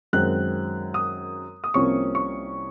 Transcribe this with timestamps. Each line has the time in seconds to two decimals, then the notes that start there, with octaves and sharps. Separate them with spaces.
0.13 F#2 D#3 G#3 C4 F#6
0.94 D#6
1.64 D#6
1.74 C2 C3 F3 A#3 C#4 C#6
2.15 C#6